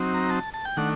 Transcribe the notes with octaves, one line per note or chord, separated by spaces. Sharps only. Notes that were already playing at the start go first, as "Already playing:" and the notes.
Already playing: F#3 C4 D#4
A#5
A5
A5
G5
D#3 A3 D4 F#5